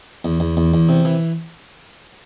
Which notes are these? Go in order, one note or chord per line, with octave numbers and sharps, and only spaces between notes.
E2
E2
E2
E2
C3
E3